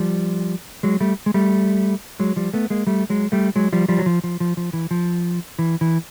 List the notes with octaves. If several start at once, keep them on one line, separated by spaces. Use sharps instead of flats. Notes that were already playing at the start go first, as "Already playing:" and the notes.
Already playing: F3 G3
F#3 G#3
G3 A3
G#3
G3 A3
F#3 G#3
F3 G3
A3 B3
G#3 A#3
G3 A3
F#3 G#3
G3 A3
F#3 G#3
F3 G3
F3 G3
F#3
F3
F3
F3
F3
E3
F3
E3
E3